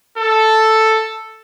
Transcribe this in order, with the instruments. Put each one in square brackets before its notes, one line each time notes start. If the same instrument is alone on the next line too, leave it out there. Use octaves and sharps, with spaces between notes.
[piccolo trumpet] A4